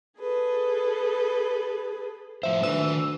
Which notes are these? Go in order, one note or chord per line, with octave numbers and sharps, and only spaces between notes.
G#4 A4 B4
A2 F3 C5 E5
D2 D#3 E3 B4 E6